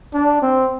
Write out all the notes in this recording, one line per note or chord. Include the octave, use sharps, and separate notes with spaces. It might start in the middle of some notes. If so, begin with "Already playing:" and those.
D4
C4